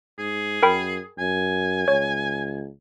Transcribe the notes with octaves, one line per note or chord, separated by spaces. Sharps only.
G#2 G#4
F#2 A#4 G5 B5
F#2 G#5
C#2 C#5